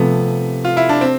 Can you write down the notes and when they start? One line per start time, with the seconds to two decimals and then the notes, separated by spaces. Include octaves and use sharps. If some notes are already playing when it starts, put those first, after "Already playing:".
Already playing: C3 F3 A3 B3
0.65 F4
0.77 E4
0.89 D4
1.01 C4